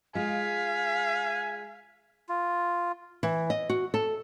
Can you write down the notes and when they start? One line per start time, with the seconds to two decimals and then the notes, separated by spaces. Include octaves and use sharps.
0.15 G#3 F4 F5 G#5 B6
2.29 F4
3.23 E3
3.50 D#5
3.70 F#4
3.94 A4